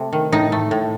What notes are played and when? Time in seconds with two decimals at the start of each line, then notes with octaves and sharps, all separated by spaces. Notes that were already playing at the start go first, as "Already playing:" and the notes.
Already playing: C3 A3
0.13 D#3
0.32 A2 D#4
0.52 A3
0.71 A2